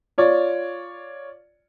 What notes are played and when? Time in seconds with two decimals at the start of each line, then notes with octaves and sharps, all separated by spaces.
0.18 F4 C#5 D5